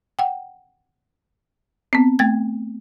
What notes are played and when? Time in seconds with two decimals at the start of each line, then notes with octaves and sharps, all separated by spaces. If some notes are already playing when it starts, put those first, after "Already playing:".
0.19 F#5 G5
1.93 B3 C4
2.19 A3 G5 G#6